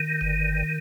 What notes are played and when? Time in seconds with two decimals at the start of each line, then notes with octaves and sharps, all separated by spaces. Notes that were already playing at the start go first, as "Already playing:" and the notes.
Already playing: D#3
0.21 G1